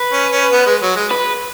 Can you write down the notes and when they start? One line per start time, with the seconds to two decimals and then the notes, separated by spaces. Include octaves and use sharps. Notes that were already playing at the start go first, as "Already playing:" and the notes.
Already playing: B4
0.12 C#4
0.32 C#4
0.52 B3
0.66 G#3
0.82 F#3
0.96 G#3
1.11 B4